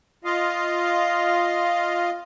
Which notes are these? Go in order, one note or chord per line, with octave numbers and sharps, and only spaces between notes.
F4 D#5 F5